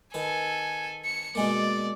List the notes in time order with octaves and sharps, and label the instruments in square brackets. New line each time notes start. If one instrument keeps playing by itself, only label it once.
[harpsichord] D#3 B4 [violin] A4 G#5
[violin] C#7
[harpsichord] B2 G#3 A#3 [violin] D5